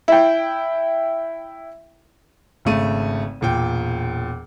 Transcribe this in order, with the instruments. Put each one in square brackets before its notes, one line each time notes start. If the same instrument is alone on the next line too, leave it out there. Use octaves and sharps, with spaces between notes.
[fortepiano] E4 G5
[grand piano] G#1 C#3 A3 D#7
E1 A#2 G5